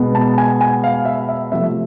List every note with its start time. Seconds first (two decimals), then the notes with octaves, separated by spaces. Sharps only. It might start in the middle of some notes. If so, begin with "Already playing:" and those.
Already playing: B2 G#3 B3
0.15 A5
0.38 G#5
0.61 G#5
0.84 F5
1.05 E5
1.29 E5
1.52 C3 F3 A3 E5